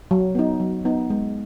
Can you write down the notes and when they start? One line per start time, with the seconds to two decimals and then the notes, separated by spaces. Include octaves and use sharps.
0.11 F#3
0.35 B3 D#4
0.60 F#3
0.85 B3 D#4
1.10 G#3